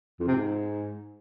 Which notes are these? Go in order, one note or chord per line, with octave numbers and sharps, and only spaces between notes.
F2
C3
G#2